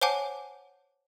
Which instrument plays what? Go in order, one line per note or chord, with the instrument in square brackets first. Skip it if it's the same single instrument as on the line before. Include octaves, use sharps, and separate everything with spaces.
[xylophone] C5 C#5 F#5 G#5 A5 D6